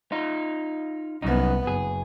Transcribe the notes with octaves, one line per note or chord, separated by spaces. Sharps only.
D#4 F4
C2 F#2 B3 D#4
F#1 G#4